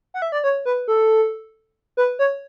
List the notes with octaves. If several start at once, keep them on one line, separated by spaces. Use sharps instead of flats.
F#5
E5
D5
C#5
B4
A4
B4
C#5